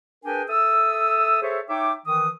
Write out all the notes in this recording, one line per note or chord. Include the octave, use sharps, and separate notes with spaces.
D4 G#4 A#4 B4 G5 G#5
A4 E5 D#6 E6
G#4 A4 C5 C#5 E5
D#4 C#5 E5 G5 D6
D#3 E3 D#6